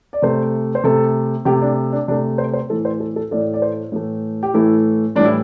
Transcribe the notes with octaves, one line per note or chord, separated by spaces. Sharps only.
D5
C3 A3 C5
C5
C3 A3 A4
C3 A3 G4
D4
D4
C3 A3 D4
C5
C5
A2 E3 A3 A4
C5
A4
A4
A2 E3 A3 D5
D5
C5
A2 E3 A3
G4
A2 E3 A3 E4
A2 E3 G3 D4
E4